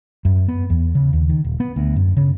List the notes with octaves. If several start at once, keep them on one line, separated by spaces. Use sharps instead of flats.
F#2
B3
E2
C#3
D#2
D#3
D#1
B3
D2
F#2
C#3